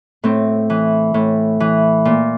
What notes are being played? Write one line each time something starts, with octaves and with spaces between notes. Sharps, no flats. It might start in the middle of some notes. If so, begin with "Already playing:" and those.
A2 C4
E3
A2
E3
A#2